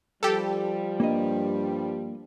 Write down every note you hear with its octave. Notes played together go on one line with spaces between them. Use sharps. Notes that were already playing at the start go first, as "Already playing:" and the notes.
F3 G3 G4 A4
G2 A#3 D#5